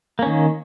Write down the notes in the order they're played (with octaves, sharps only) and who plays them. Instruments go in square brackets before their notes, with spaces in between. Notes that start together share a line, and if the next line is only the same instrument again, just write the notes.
[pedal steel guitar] A#3
C#4
D#3